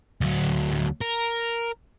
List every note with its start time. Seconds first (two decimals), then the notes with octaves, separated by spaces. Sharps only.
0.21 D2 F#3
1.01 A#4